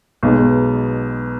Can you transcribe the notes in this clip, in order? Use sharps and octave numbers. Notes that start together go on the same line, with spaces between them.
B1 B2 G#3